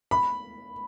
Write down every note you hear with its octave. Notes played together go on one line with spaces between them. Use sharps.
B5